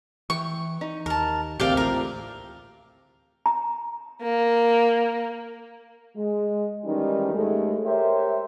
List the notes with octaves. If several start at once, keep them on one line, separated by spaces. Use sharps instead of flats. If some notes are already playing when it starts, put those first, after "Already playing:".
E3 G5 C#6
D#4
D#2 A#4 A5
A1 D2 C3 A#3 G4 D5 F5
F4 A#4 F5
A#5
A#3
G#3
D#3 E3 G3 G#3 C#4 D#4
D#2 G#3 A3
G4 A#4 C5 C#5 E5